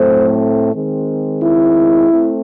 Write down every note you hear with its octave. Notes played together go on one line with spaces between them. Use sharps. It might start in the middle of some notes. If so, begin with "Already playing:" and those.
Already playing: A2 F#3 A3 C4 C5
D#3 G#3 C4
E4
A3 C4